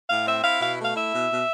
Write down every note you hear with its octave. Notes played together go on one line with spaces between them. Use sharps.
A2 F5
C4 E5
E4 F5
B2 F5
A3 F5
E4 E5
B2
B2